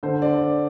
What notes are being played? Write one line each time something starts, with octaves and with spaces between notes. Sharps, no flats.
D3 C5
D5